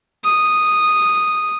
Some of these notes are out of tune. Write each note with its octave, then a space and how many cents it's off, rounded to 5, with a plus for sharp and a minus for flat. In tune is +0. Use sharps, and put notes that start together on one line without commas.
D#6 -5